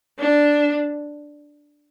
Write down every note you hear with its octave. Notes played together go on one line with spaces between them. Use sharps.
D4